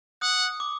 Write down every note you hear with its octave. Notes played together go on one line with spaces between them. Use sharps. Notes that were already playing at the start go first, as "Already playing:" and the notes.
F#5 D#6
D6